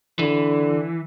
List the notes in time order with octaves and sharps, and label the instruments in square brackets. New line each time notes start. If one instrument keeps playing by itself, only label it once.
[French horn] D3 [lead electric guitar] E3